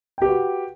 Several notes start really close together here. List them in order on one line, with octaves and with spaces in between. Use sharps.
G5 G4 B4 F#4